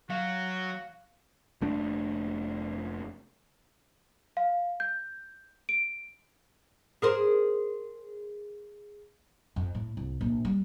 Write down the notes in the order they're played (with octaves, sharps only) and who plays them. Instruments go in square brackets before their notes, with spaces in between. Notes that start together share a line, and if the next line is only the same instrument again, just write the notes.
[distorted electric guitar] F#3 [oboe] F#4 [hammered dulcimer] F5
[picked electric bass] F1 A3 D4
[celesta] F5
G6
D7
[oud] G#4 A#4 C5
[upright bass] F2
A2
C2
A#1
G3